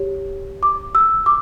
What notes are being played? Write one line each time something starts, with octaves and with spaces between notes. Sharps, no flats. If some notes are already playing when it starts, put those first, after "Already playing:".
Already playing: G4 C#5
D6
E6
D6